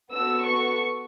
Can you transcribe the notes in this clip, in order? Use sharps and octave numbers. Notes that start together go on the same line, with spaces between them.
B3 F#4 A4 E6
C#6